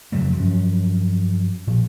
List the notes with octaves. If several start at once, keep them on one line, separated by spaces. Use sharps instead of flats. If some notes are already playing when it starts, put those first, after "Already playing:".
F2 C#3 F#3 A3
G2 F3 F#3 C#4
A#2 F3